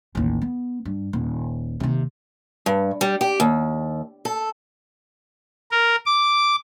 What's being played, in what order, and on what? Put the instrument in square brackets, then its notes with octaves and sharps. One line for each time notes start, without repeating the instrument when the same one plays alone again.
[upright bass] A1 D#2
B3
G2
D#1
D#2 C3
[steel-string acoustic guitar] G2
G3
G4
D#2
A4
[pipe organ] A#4
D6